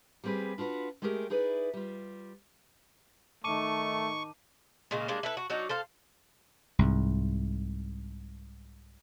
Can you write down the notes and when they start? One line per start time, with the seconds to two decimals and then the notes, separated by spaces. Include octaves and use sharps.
0.24 G3 A#3 C4 G#4 B4
0.58 D4 F4 F#4 B4
1.02 G#3 A3 G4 G#4 A#4
1.30 D#4 E4 G#4 B4 D5
1.73 G3 F4
3.44 D#3 A3 D#4 A5 C#6 D6 D#7
4.91 A#2 C#3 G#3 A#3
5.08 G3 G#3 A#3 D4
5.23 E4 A4 B4
5.37 F#4
5.50 F#3 D4 D#4 F#4
5.69 A4 C5 F5
6.79 C2 G#2